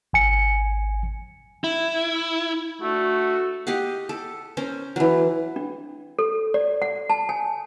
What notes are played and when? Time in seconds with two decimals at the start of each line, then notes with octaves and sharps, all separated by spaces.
0.13 G#1 G#5 C#7
1.64 E4
2.82 A3 D4 F#4
3.67 G4 D#5 F5 F#5
4.09 A4
4.57 C#4 A#4 C5
4.96 E3 F#3
5.56 D4
6.19 A4
6.54 D5
6.82 F#5
7.10 A5
7.29 G#5